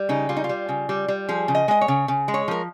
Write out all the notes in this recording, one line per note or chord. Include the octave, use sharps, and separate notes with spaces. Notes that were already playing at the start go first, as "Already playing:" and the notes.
Already playing: G3
C#3 D#4
G3 F4
D#4
F4
G3
C#3
G3
G3
F3 G#4
C#3
D#5
G#3 D#5
C#5
C#3
C#3
G#3
C#5
F3 A#4